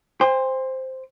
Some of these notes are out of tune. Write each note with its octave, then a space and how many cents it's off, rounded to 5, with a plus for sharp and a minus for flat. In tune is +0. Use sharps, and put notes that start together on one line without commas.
C5 +0 G5 +45